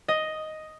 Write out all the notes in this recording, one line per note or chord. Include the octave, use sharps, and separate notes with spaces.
D#5